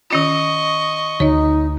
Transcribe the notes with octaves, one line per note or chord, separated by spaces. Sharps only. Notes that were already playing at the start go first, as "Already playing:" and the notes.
D#3 C#4 F4 D#5 C#6
D2 D#4 C#5 D#5